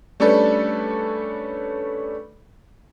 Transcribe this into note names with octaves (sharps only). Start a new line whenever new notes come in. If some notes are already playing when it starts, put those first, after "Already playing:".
G3 A3 C#4 D4 A4 B4